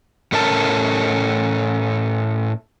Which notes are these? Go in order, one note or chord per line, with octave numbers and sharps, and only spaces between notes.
A2 A3 C#4 A#4 A5